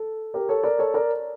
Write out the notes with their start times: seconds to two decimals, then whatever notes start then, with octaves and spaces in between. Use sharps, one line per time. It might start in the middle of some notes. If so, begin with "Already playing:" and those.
Already playing: A4
0.34 G4 A#4
0.49 A4 C#5
0.63 A#4 D5
0.79 A4 C#5
0.94 A#4 D5